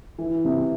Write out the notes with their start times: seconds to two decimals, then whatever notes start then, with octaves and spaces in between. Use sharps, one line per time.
0.18 E3
0.45 C3